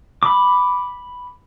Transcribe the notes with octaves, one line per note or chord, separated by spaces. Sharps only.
B5 D6